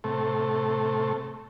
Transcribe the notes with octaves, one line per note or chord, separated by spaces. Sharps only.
A2 C3 A3